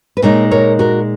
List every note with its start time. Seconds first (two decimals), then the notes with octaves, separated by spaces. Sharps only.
0.17 B4
0.22 A#2 G#3 D#4 A#4 C#5
0.51 A#4 C#5
0.79 F#4 A#4